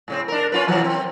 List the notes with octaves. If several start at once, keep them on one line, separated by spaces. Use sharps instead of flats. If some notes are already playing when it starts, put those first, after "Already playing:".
A2 C#3 C4
D4 A#4
C#4 F4 B4
C3 E3 F#3
C4